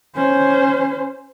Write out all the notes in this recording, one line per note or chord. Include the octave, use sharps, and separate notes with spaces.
C#4 C5